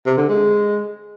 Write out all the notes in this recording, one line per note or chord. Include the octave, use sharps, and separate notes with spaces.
C3
D3
G#3